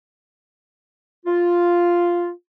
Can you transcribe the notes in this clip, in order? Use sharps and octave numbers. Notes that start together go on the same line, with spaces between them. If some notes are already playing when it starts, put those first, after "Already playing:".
F4